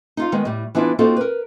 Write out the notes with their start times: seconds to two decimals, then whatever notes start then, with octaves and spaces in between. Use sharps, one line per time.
0.17 D#4 F4 F5
0.32 D#3 G#3 B3
0.45 A2 G3
0.75 E3 B3 D4 E4 F4
0.99 A#3 C4 D#4 F4 F#4 A4
1.17 A#4 B4